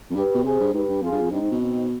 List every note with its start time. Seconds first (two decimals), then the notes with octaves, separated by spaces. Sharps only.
0.10 F2
0.16 G2 G4 B4
0.35 B2
0.44 C3 G#4 C5
0.60 G2
0.73 G#2 G4 B4
0.89 G2
1.02 F2 F4 G#4
1.12 G2
1.22 F2
1.31 G2 C4 D#4
1.41 G#2
1.51 B2
1.60 C4 D#4